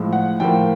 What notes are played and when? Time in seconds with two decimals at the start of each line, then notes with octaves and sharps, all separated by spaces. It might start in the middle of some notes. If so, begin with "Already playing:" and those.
Already playing: A2 F3 G#3
0.13 F#5
0.40 A2 F3 A#3 G5